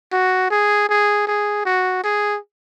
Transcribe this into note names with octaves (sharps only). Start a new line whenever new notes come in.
F#4
G#4
G#4
G#4
F#4
G#4